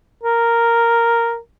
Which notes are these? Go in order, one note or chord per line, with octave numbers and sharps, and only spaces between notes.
A#4